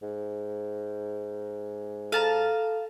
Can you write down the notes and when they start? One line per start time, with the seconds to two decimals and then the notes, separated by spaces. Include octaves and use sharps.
0.02 G#2
2.12 A4 F5 A5 A#5